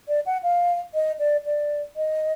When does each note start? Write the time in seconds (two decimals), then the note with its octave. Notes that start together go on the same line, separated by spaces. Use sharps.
0.08 D5
0.26 F#5
0.43 F5
0.94 D#5
1.19 D5
1.46 D5
1.96 D#5